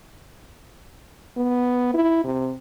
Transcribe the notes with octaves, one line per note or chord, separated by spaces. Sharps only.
B3
E4
C3